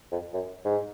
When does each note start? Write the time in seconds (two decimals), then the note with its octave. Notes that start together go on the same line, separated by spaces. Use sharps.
0.12 F2
0.33 F#2
0.65 G#2